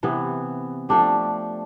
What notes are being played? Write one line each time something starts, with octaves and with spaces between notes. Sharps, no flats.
C3 E3 B3
F3 A3 D4 G4